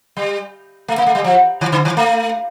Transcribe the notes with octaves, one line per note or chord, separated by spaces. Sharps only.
G3
A3
A#3
A3
G3
F3
D#3
D3
D#3
A3